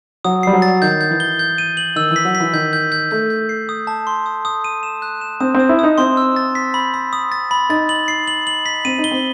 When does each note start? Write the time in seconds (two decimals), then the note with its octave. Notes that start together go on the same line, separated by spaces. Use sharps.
0.25 F#3 D#6
0.43 G3 C7
0.53 F#3
0.62 A6
0.82 D#3 G6
1.01 G6
1.11 E3
1.20 G7
1.39 G6
1.58 D#7
1.77 F#7
1.96 D#3 E6
2.11 E3
2.16 B6
2.25 F#3
2.35 B6
2.40 E3
2.53 D#3 G6
2.73 G6
2.92 G6
3.11 A3 G6
3.30 G6
3.49 C7
3.69 D#6
3.87 A5
4.07 C6
4.26 D#6
4.45 D#6
4.64 D#7
4.83 E7
5.02 F#6
5.21 E7
5.40 C4 D#6
5.55 C4
5.60 D#6
5.69 E4
5.79 D#4 D#6
5.98 C4 C6
6.17 E6
6.36 A6
6.55 B6
6.74 B5
6.94 B5
7.13 D#6
7.32 A6
7.51 B5
7.69 D#4 A6
7.89 F#7
8.08 C7
8.28 F#7
8.47 F#7
8.66 B6
8.85 C4 D#7
8.98 D#4
9.04 G7
9.11 C4